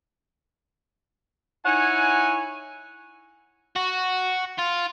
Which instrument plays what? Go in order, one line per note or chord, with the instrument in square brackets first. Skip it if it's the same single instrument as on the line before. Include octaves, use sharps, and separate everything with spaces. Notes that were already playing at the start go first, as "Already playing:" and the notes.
[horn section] D#4 E4 C#5 F#5 G#5
[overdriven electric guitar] F#4
F4